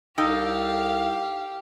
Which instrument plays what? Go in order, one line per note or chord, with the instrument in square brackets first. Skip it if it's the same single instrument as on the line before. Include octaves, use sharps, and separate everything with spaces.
[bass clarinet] C2 [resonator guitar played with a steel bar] D#4 A4 G5 [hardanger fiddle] G4 [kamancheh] F5